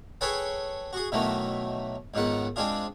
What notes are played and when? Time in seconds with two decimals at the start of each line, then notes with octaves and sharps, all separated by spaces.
0.21 G#4 A4 B4 C#5 G5 G#5
0.93 F#4 G#4
1.12 B2 D#3 E3 F#3 A3 B3
2.14 C#2 G#2 D#3 B3 F#5
2.56 G#3 C4 D4 F4 G#4